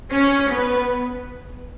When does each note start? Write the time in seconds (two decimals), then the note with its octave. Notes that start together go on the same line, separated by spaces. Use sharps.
0.13 C#4 C#5
0.51 B3 B4